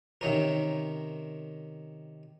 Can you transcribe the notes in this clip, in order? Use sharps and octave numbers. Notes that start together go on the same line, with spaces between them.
C3 D#3 C#4 A#4